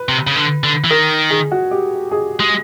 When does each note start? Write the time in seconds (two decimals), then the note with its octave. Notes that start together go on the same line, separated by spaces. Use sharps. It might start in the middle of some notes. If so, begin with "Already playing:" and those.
Already playing: B4
0.09 C3
0.27 C#3
0.36 D3
0.64 D3
0.84 E3
0.90 D#3 A#4
1.30 G#4
1.51 F#4
1.71 G4
2.11 G#4
2.40 G#3